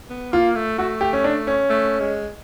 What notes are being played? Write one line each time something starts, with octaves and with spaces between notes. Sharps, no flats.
B3
A#3 F4
A3
A3 F#4
G4
C#4
D4
C#4
A3
G#3